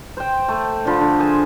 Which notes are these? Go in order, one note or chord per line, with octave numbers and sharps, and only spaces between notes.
C5 G5
A3
D3 F3 B5
D3
G#4 C5 G#5